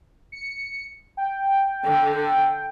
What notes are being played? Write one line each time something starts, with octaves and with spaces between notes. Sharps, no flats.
C#7
G5
D3